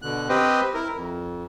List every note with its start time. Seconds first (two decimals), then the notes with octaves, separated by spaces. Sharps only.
0.02 B2 D3 F#6
0.29 C4 G4 B4 C5 D#5
0.74 E4 A#4
0.94 F2